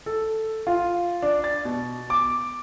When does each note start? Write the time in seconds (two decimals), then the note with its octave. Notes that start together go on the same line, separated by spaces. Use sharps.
0.06 A4
0.67 F4
1.22 D4
1.44 A6
1.65 B2
2.10 D6